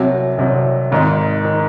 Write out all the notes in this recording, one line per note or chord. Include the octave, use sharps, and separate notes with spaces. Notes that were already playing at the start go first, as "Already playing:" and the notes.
Already playing: C2 C3 F#3
C2 C3 F#3
G#1 G#2 D#3
D#3